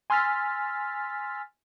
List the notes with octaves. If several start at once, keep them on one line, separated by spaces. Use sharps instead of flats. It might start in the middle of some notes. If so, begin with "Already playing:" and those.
G#5 C6 E6 F6 A6 B6